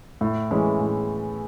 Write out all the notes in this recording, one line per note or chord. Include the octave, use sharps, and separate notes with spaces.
A2
E3 G#3 C#4 E4
A2